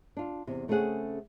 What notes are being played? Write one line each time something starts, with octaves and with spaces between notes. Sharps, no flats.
D4 F4
E2 C3
C#3 A3 C4 C#4 G#4 F#5